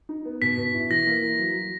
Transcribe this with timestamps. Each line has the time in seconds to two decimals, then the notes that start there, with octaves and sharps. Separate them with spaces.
0.09 D#4
0.25 B3
0.42 B2 B6
0.58 B2
0.74 E4
0.90 E3 A#6
1.07 A#3
1.23 E3
1.39 F#3
1.55 F#3